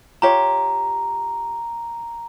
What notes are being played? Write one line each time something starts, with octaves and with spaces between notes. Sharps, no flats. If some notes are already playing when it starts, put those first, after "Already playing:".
F4 G4 C#5 A#5